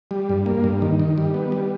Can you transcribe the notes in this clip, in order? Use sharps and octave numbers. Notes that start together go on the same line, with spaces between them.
G3
G2
A#3
G2
D#3
D#3
G3
B3
G3